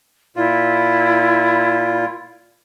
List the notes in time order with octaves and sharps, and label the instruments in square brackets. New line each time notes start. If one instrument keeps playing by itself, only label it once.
[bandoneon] A#2 F4 [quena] E4